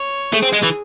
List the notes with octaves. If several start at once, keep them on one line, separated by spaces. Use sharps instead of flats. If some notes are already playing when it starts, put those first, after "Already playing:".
Already playing: C#5
A3 G#4
C4
G#3
E3